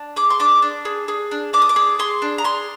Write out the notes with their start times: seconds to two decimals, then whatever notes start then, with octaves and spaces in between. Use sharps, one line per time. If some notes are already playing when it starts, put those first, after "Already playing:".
Already playing: D4
0.16 G#4 D6
0.30 C6
0.39 D4 D6
0.62 D4
0.85 G#4
1.08 G#4
1.31 D4
1.53 D4 D6
1.62 D#6
1.69 D6
1.76 G#4
1.99 G#4 C6
2.22 D4
2.38 A#5
2.44 G#4 C6